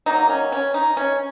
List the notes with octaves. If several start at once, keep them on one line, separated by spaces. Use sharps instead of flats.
D#3 F#3 A#3 D#4
C#4
C#4
D#4
C#4